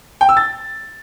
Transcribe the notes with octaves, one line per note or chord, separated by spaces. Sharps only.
G5
E6
A6